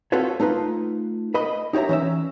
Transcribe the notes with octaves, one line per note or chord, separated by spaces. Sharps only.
C4 F4 F#4 A4 B4 C#5
A3 D#4 F4 B4
B4 D#5 B5
D#4 G4 C#5 E5 A#5
E3 C#4 E5